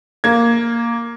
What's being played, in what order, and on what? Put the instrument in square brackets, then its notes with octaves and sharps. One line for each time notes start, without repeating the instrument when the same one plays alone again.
[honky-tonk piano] A#3 G#6